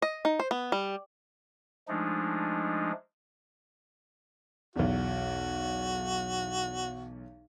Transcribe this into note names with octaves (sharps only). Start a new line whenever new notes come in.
D#5
D#4
C5
B3
G3
F3 G#3 A3 D4 D#4
B1 E2 F#4